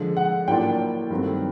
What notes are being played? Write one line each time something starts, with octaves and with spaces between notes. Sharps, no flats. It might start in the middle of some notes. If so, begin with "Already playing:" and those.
Already playing: D3 F3 G#3
F#5
A2 F#3 A#3 D4 F4 G5
G2 D#3 F#3 A3 C4